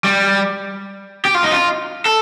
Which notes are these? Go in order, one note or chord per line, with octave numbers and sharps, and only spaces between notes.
G3
G4
F4
D#4
F4
A4